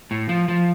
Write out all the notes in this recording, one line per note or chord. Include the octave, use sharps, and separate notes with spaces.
A2
F3
F3